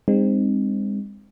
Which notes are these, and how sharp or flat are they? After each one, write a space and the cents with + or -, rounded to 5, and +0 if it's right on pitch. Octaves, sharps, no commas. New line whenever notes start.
G#3 -35 C4 +0 D#4 -25